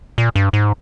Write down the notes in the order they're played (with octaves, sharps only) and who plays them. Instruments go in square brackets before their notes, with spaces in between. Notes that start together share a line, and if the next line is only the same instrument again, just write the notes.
[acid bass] A#2
G2
G#2